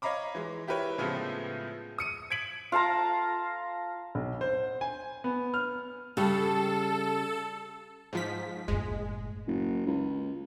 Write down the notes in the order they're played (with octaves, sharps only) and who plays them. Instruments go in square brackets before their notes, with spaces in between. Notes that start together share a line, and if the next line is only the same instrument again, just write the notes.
[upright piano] C#5 D#5 F5 A#5 B5 D6
E3 G#3
E4 G4 A#4 B4 C#5
A2 C#3 F3 G#3 A3 B3
D#6 C#7 D#7
G#6 B6 D7 F#7
[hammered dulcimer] F4 F5 A5 A#5
[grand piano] B1
C5
G#5
B3
F6
[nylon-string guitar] C#3 G3 [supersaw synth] A4
[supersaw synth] G#2 F3 B6
[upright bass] F#1 A2 [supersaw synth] G#3
[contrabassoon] F#1
C#2